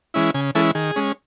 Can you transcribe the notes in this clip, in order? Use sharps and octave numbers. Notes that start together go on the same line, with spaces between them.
E3 G#3 C#4 E4
C#3 G#5
E3 G#3 C#4 E4 A4
D#3 G#4
G#3 C#4